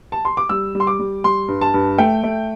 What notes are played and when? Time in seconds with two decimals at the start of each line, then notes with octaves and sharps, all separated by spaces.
0.12 A5
0.25 C6
0.37 D6
0.49 G3 E6
0.75 G3
0.80 C6
0.87 D6
0.99 G3
1.24 G3 C6
1.48 G2
1.61 A5
1.74 G2
1.98 A3 G5
2.24 A3